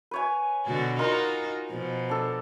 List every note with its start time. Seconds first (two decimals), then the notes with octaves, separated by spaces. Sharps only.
0.11 B4 C#5 G#5
0.65 B2 D3 F#4
0.99 D#4 F4 F#4 A#4 C6
1.69 B2 F3
2.09 D4 A4